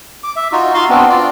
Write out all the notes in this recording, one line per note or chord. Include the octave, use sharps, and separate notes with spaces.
D6
E5
D#4 F4 F#4
F4 F#4 F5 C6
B3 C4 D4
F4 D5